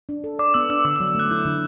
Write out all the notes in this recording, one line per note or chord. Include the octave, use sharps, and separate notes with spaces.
D4
A4
D5 D6
B3 E6
D4 E6
D3 D6
E6
F#3
E6
A3 F#6
E4 G6
D3